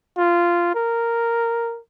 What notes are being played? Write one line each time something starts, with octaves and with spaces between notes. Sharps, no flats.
F4
A#4